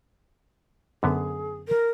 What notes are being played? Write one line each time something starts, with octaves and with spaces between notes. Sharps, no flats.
F#2 D3 B3 G#4
A#4